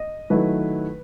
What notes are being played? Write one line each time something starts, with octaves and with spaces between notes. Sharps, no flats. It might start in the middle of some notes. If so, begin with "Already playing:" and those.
Already playing: D#5
D#3 F#3 A3 E4 B4